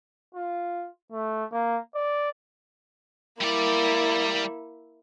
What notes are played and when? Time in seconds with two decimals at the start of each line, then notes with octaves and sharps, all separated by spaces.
0.35 F4
1.12 A3
1.52 A#3
1.95 D5
3.42 G3 A#3 E4 D5